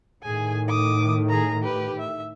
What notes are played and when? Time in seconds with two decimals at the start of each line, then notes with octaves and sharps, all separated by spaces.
0.23 A2 D#3 G#4 G#5
0.68 D6 D#6
1.29 G#4 A#5
1.62 G4 B4
2.00 E5